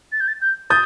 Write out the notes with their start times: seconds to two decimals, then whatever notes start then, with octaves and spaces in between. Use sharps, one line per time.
0.12 A6
0.20 G6
0.28 A6
0.41 G6
0.70 D#6 G6 A6